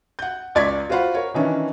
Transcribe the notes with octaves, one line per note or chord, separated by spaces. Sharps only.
F#5 G6
C#2 D5 C#6 G#6 A6 B6
F4 F#4 C5 F5 F#5 B5
A#4 C#5
D#3 E3 C#4 D4 E4